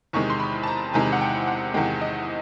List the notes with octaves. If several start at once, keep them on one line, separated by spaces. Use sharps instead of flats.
E2 C3 D#3 G#3 C#6
C6
B5
A5
A#5
E2 C3 D#3 G#3 G#5
F#5
G5
F#5
E2 C3 D#3 G#3 G5
D#5